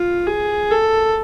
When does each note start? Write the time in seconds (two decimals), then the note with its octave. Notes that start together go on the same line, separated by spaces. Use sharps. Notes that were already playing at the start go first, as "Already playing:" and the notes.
Already playing: F4
0.27 G#4
0.71 A4